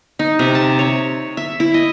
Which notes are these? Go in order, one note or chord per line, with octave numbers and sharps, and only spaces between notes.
D#4
C3
A5
C#5
E5
E4
D#5